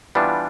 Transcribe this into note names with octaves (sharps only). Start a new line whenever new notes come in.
E3 G3 B3 D4 F4